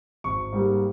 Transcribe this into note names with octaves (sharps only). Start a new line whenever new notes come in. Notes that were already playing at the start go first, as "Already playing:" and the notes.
G#1 C#6
G#2 G3 A#3